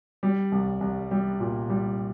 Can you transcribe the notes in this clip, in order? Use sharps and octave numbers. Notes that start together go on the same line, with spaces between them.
G3
C2
C2
G3
A#2
G3